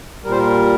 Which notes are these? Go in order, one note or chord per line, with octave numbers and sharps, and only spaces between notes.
A#2 G3 A#4 C5
A#4